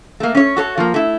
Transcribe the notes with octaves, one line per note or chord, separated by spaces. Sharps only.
A3 A#3
C#4 C#5
F#4 A4 C#5
F3 A#3
A3 E4